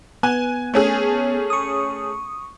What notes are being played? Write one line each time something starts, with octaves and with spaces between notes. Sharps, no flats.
B3 G#5
A3 C#4 G#4
C#6 D#6